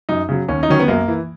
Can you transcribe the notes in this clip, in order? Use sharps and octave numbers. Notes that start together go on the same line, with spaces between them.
F#2 D#4
C#3 F#3
D#2 C#4
D#4
D#3 F#3 C#4
B3
F#2 A#3
E3